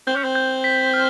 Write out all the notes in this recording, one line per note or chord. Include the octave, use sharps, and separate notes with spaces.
C4 G6
C#4
C4
G6
B6
F6